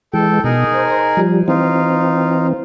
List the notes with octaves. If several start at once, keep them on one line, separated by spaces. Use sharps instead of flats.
E3 G#3 A4 G5
B2 D#4 G#4 A#4
C5
F3 G3
E3 C4 D#4 F4